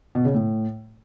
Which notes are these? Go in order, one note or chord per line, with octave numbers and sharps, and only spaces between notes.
B2
C#3
A2